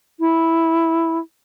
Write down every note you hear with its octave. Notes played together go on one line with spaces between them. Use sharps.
E4